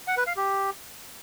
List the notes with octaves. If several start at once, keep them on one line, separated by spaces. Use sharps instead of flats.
F#5
B4
F5
G4